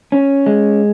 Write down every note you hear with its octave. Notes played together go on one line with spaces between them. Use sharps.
C#4
G#3